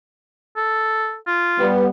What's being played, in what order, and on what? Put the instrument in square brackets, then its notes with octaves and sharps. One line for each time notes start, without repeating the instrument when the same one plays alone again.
[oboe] A4
F4
[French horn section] G3 B3